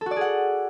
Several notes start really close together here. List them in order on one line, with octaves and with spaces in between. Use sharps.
A4 F#4 D5 G#4 F#5